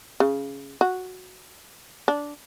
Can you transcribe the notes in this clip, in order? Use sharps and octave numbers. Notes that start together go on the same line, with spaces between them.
C#3
F#4
D4